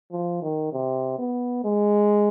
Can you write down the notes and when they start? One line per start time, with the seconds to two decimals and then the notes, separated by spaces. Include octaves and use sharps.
0.12 F3
0.42 D#3
0.73 C3
1.19 B3
1.64 G#3